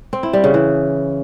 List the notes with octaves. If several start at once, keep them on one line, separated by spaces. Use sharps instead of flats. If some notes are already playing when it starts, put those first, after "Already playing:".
C4
E4
G3
C#3
E3